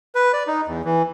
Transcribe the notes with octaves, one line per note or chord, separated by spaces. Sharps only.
B4
D5
D#4
E2
E3